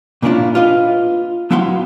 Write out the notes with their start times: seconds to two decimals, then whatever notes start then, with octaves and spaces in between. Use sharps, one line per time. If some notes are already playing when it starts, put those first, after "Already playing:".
0.22 A#2 A#3 C#4 D4 E4 F4
0.55 F4 B4 D#5
1.51 F#3 B3 E4 F5 F#5 C6